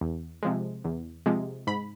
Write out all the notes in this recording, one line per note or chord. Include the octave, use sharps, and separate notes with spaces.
E2
C3 F3 G#3
E2
C3 F3 G#3
G#2 B5